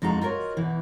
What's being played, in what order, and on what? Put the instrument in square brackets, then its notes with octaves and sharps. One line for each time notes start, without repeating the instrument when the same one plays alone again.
[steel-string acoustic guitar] F2 G#3 D#4 F#4 A#5
F4 F#4 A#4 C#5 D#5
E2 B2 E3